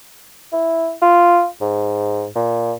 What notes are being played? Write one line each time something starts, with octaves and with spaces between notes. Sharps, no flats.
E4
F4
G#2
A#2